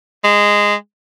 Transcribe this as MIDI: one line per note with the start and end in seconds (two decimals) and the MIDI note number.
0.24 0.75 56